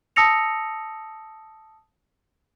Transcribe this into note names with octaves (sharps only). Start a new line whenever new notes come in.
A5 D#6 E6 A#6 C#7 F7